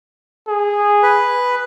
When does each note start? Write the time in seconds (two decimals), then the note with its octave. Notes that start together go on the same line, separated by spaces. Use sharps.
0.48 G#4
1.03 B4